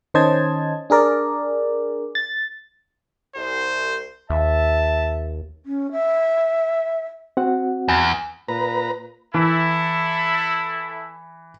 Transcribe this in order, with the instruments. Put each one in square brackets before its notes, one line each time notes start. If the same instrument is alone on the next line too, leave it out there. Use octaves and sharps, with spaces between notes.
[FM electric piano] D#3 C#4 C5 D#5 A5 G#6
D4 G#4 A#4 D5
A6
[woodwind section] C2 [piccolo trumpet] C5
[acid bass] D#2 [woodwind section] E5 [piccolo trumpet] A5
[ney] C#4
E5
[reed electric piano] C4 F#4 F#5
[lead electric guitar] E2
[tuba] A#2 [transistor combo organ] B4 A#5
[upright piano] E3 [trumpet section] E4 A4